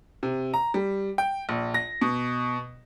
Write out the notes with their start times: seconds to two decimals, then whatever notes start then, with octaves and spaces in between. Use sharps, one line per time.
0.23 C3
0.54 A#5
0.74 G3
1.18 G5
1.49 A#1
1.74 A#6
2.01 B2